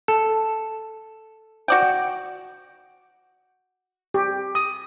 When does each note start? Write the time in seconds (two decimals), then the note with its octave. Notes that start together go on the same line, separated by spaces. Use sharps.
0.08 A4
1.68 F#4 D5 G5
4.14 G4
4.55 D#6